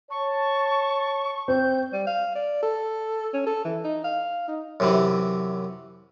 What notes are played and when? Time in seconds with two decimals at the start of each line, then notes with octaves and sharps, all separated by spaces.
0.11 C#5 A5 C#6
1.48 C4 G6
1.93 G3
2.07 F5
2.35 D5
2.63 A4
3.34 C#4
3.47 A4
3.65 E3
3.85 D#4
4.04 F5
4.48 D#4
4.80 F#2 C3 E3